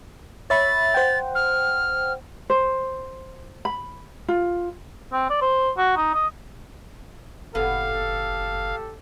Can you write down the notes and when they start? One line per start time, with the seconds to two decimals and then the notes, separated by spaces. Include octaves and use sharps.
0.50 C#5 E5 B5 A6
0.94 C5 F#5 G5
1.35 F6
2.50 C5
3.65 B5
4.28 F4
5.13 C4
5.30 D5
5.42 C5
5.78 F#4
5.97 D#4
6.14 D#5
7.55 F#1 A2 B3 G4 A4 F5